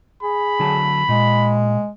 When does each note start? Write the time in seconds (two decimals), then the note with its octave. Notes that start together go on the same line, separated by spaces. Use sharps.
0.23 G#4 B5
0.60 D3 F#3 A5
1.09 A#2 G#3